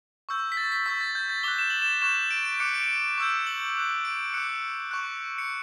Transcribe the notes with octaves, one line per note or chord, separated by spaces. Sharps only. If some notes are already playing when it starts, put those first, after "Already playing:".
C#6 E6 G6
B6
A6
B6
C#6 E6 G6 B6
A6
G6
A6
D6 F#6 G7
E7
F#7
E7
C#6 F#6 E7
D7
D7
D6 F#6 C#7
D7
C#6 E6 G6
F#7
D6 F#6
D7
D6 F#6 C#7
C#6 F#6
C#7